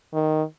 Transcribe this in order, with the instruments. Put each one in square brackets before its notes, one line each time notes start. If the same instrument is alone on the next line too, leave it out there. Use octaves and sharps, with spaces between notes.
[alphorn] D#3